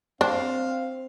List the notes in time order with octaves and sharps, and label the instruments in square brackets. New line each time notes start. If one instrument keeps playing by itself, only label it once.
[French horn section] C4 [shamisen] D4 [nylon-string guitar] C5 [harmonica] F5